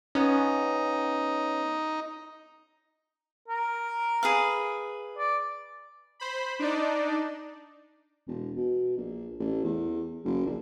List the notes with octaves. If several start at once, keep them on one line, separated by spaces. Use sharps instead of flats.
B3 C#4 D#4
A#4
G#4 B4 F5
D5
C5 B5
D4 D#4 D5
E1
B2
A#1
A1
E2
F#1
A#1